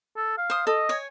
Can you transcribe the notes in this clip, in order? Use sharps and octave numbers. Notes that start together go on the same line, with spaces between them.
A4
F5
C5 D#6
A4 D#5
C#5 G#5